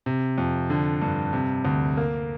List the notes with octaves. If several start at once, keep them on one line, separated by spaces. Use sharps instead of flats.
C3
F2
D3
G2
C3
D2
A#3